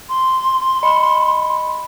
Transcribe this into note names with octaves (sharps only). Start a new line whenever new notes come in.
C6
D#5 B5 C#7